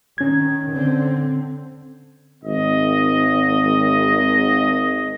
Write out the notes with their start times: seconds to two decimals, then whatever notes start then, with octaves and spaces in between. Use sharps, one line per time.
0.18 D#3 C#4 G#6
0.70 D3 C4
2.44 G#1 D#5